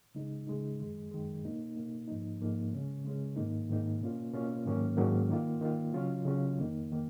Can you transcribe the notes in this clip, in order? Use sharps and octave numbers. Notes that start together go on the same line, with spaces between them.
C#3 G#3 D#4
C#3 G#3 D#4
F#2 D#3 G#3
F#2 D#3 G#3
B2 A#3 D#4
B2 A#3 D#4
G#2 F3 A#3 D#4
G#2 F3 A#3 D#4
C#3 G#3 C#4
C#3 G#3 C#4
G#2 D#3 A#3 D#4
G#2 D#3 A#3 D#4
B2 A#3 C#4 F4
B2 A#3 C#4 F4
G#2 D#3 F#3 A#3 C#4
G#2 D#3 F#3 A#3 C#4
D#3 A#3 F4
D#3 A#3 F4
C#3 F#3 C#4 F4
C#3 F#3 C#4 F4
F2 D#3 A#3 D#4
D#3 A#3